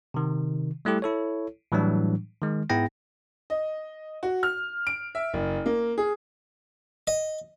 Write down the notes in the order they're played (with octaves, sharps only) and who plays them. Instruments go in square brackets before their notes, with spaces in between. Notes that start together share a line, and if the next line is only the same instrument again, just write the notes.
[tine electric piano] C3 D#3
G3 A3 E4 G4 A4
E4 A4 C#5
A2 E3 F#3 G3 D4
D#3 G#3
G#2 B3 E4 G#4 G5 A#6
[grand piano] D#5
F#4
F6
D7
E5
F#1
A#3
G#4
[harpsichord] D#5